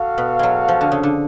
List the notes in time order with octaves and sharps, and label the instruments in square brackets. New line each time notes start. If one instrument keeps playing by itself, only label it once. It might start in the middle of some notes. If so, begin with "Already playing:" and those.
Already playing: [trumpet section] F#4 A4 F5
[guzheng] B2
F#3 G#3
F3
D3
C#3
D3